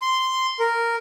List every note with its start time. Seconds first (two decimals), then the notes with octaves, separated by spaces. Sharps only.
0.02 C6
0.59 A#4